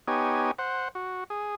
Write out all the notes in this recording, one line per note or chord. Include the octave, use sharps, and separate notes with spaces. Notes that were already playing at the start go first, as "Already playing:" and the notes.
B3 D#4 G4 C#5 G#5
C5 F#5
F#4
G#4